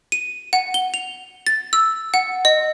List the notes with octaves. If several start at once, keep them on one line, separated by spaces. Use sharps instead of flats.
D#7
F#5
G7
F7
A6
E6
F#5
D#5